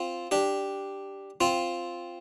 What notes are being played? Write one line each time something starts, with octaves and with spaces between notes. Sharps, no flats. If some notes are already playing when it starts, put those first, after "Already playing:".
Already playing: C4 F4
D4 G4
C4 F4